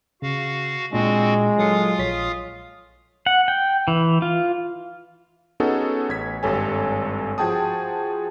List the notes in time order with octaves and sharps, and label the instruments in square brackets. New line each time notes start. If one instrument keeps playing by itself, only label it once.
[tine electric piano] C#3 [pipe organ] F#4 F5
[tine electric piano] A#2 D4 [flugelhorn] G#3 [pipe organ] C4 F#4
[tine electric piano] F#3 A4 C#7 [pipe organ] F4 F5 D#6
[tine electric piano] A#1 C#5 B6
[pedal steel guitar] F#5
G5
E3
F4
[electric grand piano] B3 C#4 D#4 F#4 G#4 A4
A1 G#6 B6
G#1 G2 G3 A4 C#5 G#5
F3 F#4 G#4 G5 A5 D#6